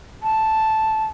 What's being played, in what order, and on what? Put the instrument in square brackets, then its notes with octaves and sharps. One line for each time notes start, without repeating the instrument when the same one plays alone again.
[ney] A5